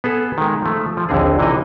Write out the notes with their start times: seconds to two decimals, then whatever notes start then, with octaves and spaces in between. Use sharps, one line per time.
0.04 B3 G#4 A4
0.38 D#3 G#3
0.62 F3 A3
0.97 F3
1.09 A#1 D#2 D3 C4 G#4
1.39 C3 E3 A#3 D#4 D#5 G#5